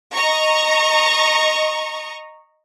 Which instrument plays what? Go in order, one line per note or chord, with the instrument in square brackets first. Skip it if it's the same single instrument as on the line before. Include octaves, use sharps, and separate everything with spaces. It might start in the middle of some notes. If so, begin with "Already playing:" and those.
[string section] D#5 A#5 C#6